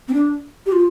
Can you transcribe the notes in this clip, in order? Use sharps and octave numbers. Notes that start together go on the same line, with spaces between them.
C4
D4
G4
F4